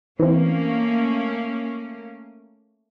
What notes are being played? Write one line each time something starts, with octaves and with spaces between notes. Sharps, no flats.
E3 A3 A#3 C4 C#4